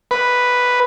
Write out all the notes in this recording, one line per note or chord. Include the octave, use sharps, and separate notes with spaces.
B4